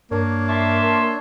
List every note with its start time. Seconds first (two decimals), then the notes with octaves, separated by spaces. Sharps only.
0.11 G2 A#3 D4 C#5
0.48 E5 A5 C6